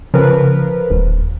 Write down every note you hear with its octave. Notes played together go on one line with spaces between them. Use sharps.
C#3 F3 A#4 B4
D#1